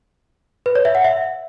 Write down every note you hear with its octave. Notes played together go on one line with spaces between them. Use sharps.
B4
C#5
E5
F#5
E5